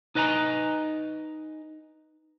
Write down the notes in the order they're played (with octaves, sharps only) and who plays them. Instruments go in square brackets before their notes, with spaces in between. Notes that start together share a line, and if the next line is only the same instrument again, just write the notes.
[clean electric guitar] D#4 B4 D#5 G#5 A#5